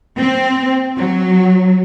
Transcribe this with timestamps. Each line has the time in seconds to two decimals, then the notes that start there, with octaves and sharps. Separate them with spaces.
0.18 C4
0.97 F#3